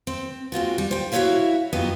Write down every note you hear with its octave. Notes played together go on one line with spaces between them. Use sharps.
C4
G#3 C4 F4 F#4
G3
C5 G5
E4 F#4 A#4 C#5 E5 F5
F#2 F#3 B3 F4 G4 D#5